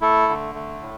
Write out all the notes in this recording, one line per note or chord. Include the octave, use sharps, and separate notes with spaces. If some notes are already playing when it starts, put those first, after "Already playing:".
A3 E4 A4
D3
A3
A2